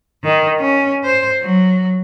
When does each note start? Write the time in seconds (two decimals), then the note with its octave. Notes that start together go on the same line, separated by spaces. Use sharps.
0.24 D#3
0.60 C#4
1.04 C5
1.41 F#3